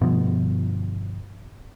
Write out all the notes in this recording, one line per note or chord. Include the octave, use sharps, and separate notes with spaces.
G1 B2 F3